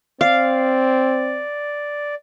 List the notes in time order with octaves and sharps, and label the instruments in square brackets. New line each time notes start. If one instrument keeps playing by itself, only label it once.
[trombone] C4 [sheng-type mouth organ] D5 [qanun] F5